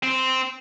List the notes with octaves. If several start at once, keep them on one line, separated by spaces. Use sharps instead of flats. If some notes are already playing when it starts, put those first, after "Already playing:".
C4